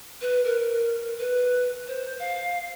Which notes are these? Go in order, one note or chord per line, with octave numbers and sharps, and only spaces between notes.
B4
A#4
B4
C5
F5